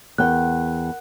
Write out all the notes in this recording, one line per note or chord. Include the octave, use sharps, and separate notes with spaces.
E2 A#4 F#5 G5 F#6